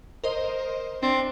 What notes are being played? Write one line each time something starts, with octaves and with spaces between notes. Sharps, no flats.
A#4 C5 D#5
C4 D4